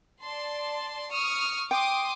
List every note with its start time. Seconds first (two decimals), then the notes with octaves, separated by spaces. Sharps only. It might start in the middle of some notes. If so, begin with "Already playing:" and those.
0.23 D5 A5 C6
1.12 C#6 D#6 F6
1.71 G5 C6 D6 D#6